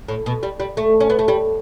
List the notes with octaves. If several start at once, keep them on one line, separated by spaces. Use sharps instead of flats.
A2
B2
G3
G3
A3
C#4
B3
A3
G3